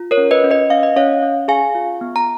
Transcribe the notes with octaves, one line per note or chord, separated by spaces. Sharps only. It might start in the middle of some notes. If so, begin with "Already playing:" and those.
Already playing: F4
A#4 C#5
C#4
B4 D#5
C#4
B4 D#5
C#4 F5
D#5
C#4 C#5 F5
C#4
G#4 F5 G#5
F4
B3
A#5